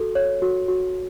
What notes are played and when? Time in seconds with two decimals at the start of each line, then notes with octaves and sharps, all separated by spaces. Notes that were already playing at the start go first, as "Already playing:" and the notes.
Already playing: F#4 A4
0.15 C#5
0.42 F#4
0.68 F#4